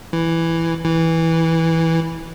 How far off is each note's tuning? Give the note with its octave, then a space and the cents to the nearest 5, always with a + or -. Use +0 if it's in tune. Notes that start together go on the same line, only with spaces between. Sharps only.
E3 +5
E3 -10